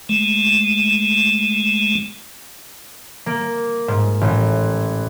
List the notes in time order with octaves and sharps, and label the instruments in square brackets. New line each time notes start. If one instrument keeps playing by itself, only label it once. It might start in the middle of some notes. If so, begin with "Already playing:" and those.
[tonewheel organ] G#3 A3
[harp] A#3
G#2
A1